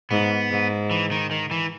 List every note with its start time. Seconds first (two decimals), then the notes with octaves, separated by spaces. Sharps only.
0.11 G#2 B3
0.51 G#2
0.91 E3
1.11 D#3
1.31 D#3
1.51 E3